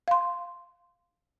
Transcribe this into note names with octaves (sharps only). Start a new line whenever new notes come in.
F5 C6